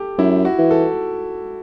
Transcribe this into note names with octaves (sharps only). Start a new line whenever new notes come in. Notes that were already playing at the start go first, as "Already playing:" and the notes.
Already playing: G4 A4
F#2 E4
F#4
E3
A4